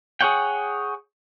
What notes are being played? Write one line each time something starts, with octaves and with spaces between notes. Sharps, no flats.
G#4 A#4 C#5 F#5 G5